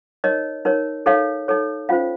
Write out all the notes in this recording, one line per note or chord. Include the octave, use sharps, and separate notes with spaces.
D#4 A#4 C#5 D#5
D#4 A#4 C#5
D#4 A4 C#5 F5
D#4 A4 C#5
C#4 F4 C5 F5